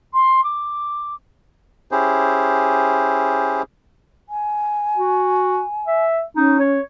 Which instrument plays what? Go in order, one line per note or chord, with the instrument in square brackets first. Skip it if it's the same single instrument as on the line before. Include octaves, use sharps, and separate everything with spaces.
[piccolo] C6
D6
[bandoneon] C#4 E4 G4 G#4 C5
[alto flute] G#5
[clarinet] F#4
E5
[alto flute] C#4 [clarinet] D#4
[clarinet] C#5